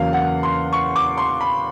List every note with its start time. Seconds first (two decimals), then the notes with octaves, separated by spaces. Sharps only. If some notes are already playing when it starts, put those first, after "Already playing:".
Already playing: E2 C#3 F#3 A#3 F5
0.13 F#5
0.43 C6
0.73 C#6
0.96 D6
1.18 C6
1.41 B5